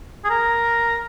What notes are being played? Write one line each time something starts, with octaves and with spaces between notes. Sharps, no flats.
G#4
A#4